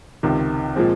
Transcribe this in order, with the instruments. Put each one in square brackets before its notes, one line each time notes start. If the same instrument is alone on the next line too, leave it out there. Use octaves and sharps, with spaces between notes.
[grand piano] C#2 C3 D#3
A#2 F3 G#3 C4